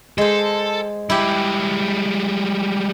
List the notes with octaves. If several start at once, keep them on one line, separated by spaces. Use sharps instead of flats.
G#3 A4 C5
G3 G#3 E4 G4